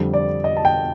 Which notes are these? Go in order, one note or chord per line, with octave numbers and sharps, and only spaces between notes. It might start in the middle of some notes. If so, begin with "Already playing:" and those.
Already playing: F2 D3 G3
D5
D#5
A5
G5